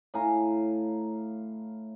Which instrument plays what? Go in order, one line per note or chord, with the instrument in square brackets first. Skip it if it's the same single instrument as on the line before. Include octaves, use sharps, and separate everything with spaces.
[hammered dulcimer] A2 F5 G#5 A#5